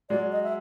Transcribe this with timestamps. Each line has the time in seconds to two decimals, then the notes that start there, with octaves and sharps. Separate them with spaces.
0.09 F#3 G#3 D5
0.32 D#5
0.43 E5